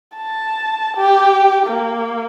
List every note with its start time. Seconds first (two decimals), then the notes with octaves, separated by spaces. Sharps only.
0.16 A5
0.97 G4
1.67 A#3